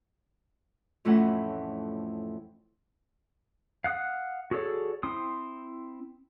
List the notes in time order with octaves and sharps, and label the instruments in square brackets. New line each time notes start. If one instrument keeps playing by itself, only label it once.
[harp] F2 A2 E3 A3 C#4 F#5
[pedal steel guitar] F5 F#5 D#6
F#4 G#4 A4 C#5 D5
C4 E4 C6 D#6